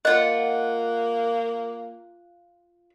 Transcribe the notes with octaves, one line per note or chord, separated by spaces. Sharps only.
A#3 F4 D#5 F#5